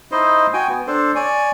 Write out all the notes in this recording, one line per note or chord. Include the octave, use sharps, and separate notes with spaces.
D#4 E4 C5 D#5
F#4 G5 G#5
B3
D4 A4 C5
C#5 D5 G#5